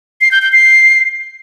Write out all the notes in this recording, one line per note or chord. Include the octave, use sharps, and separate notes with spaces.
C7
G6
G6
C7